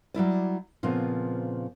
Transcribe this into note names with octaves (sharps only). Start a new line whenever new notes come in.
F#3 G3 E4 D5
A#2 C#3 F3 B3 C4